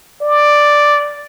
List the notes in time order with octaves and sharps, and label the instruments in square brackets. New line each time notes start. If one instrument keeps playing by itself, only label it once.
[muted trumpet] D5